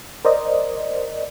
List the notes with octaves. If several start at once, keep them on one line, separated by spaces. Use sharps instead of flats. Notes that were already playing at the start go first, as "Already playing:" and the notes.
A#4 C5 D5 D#5